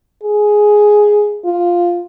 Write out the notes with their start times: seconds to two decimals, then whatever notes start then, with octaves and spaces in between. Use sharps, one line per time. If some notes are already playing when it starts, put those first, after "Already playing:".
0.23 G#4
1.45 F4